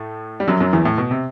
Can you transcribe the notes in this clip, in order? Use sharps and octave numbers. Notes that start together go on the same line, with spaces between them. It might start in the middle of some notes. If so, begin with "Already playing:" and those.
Already playing: A2 A3
G3
F#2 F#3
F#2 F#3
E2 E3
A2
B2
C3